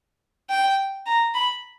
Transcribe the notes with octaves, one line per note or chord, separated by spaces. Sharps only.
G5
A#5
B5